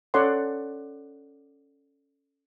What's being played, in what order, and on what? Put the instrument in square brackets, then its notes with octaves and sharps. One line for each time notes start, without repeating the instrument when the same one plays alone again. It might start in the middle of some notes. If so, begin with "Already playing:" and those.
[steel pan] C#4 A4 C#5 D5 F#5 C6